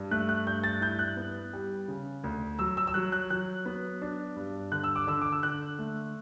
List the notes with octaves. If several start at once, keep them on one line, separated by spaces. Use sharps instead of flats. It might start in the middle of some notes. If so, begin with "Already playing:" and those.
Already playing: G2
A3 F#6
F#6
G2 G6
A6
E4 G6
F#6
B3
G3
C#3
D2
F#3 E6
E6
E6
F#3 F#6
F#6
F#3 F#6
B3
D4
G2
D3 F#6
E6
D6
D3 E6
D6
E6
D3 F#6
A3